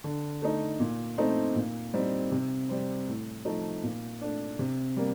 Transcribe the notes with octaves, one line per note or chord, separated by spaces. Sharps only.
D3
A3 D#4
A#2
A3 C4 D#4
A#2
G3 C4 D#4
C3
G3 C4
A2
F3 A3 D#4
A#2
A3 D4
C3
G3 A#3